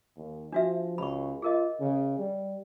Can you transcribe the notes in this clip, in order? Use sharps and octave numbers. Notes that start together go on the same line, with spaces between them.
D#2
F3 D4 F#4 E5
C#2 B5 C#6
F4 G#4 A#4 D#5
C#3
G3